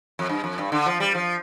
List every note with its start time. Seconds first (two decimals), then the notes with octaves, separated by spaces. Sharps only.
0.19 F2
0.29 G2
0.44 F2
0.58 G2
0.72 D3
0.86 F3
1.00 G3
1.15 F3